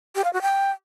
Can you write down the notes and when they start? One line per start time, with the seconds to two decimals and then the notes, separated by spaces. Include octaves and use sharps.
0.15 G4
0.24 F5
0.33 F#4
0.42 G5